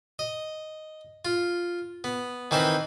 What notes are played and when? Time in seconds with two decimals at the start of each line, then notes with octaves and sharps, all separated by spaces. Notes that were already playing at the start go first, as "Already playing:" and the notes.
0.19 D#5
1.25 F4
2.04 B3
2.51 D#3 E3 C4 B4 C5